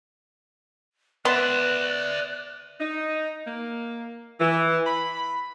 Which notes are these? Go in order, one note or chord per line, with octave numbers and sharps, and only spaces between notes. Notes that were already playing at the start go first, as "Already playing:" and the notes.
B3 D5 E5 C6 F#6
D#4
A#3
E3
B5